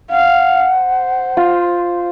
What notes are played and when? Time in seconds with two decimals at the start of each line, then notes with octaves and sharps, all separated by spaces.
0.11 F5 F#5
0.76 C5
1.37 F4